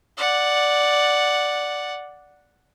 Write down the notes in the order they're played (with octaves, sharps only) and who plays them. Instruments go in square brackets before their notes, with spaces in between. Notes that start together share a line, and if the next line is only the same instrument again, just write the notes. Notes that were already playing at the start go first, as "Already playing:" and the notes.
[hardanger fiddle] D5 F#5